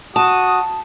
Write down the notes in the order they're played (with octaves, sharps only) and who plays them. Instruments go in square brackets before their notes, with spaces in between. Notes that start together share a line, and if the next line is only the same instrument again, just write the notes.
[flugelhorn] F#4 [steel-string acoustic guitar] A5 [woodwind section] D#6